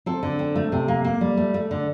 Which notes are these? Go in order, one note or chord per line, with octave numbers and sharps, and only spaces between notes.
C4 A4
D3
C4
A3
C3
A#3
A#3
G3
A3
A3
D3